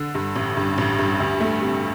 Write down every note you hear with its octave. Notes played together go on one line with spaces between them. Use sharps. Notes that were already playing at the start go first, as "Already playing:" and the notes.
Already playing: D3
G2
A1
G2
A1
G2
D2
A3
C3